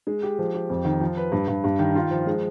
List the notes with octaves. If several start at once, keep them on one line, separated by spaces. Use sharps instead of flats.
G#3
G4
F3
G4
F2
D#3
F3
B4
G2
G2
G2
D#3
F4
F3
G#3